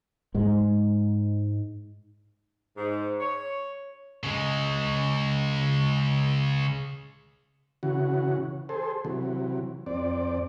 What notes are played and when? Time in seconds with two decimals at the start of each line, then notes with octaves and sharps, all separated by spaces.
0.34 G#2 G#3
2.77 G#2
3.20 C#5
4.24 C#3 G#3
7.83 C#3 E3 F#4
8.69 G#4 A4 C5
9.05 C3 E3 F#3
9.86 F2 C4 D5